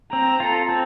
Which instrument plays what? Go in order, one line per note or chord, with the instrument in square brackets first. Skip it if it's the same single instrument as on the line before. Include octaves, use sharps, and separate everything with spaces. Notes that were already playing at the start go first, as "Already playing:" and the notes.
[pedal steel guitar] C4 [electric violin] A#5
[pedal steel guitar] F4 A4
C4